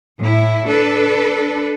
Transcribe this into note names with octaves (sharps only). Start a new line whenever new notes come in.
A2 E4
D4 A4 B4